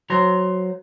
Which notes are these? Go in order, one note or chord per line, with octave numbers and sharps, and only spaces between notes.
F#3 C5 A#5